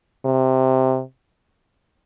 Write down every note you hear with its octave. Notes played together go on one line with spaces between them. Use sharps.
C3